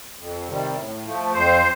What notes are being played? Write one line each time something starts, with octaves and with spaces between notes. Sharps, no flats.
F2
C3 D#3 G3
A2
F3 A3
F2 C5